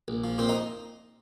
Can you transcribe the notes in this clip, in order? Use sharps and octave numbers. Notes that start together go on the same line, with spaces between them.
A#1
F3
A#2 C4 C5
D#4 D#5